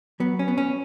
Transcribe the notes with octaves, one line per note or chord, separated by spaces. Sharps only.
F#3 B3
C#4
B3
C#4